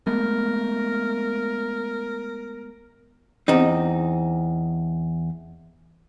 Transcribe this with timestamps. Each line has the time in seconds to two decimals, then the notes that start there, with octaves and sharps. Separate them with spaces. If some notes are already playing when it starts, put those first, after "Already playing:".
0.07 G#3 A3 B3 A#4
3.48 E2 C4 D#4